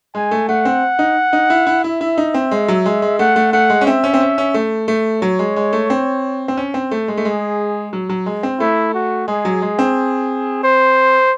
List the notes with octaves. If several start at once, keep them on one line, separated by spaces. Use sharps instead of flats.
G#3 G#5
A3
A3 F#5
C4
D#4
D#4
E4
E4
E4 E5
E4
D#4
C4
G#3
F#3
G#3
G#3
A3 F#5
A3
A3 F#5
G#3
C#4
C4 E5
C#4
C4
C#4
C#4
A3
A3
F#3 C#5
G#3
G#3
A3
C4
C4
C#4
C4
A3
G#3
A3
G#3 G#4
F#3
F#3
G#3
C4
A3 E4
F#4
G#3 G#4
F#3
G#3
C4
C5